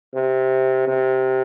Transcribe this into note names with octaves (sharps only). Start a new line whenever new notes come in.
C3
C3